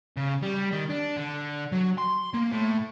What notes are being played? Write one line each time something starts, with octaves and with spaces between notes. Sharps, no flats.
C#3
G3
D#3
D4
D3
F#3
C6
A#3
A2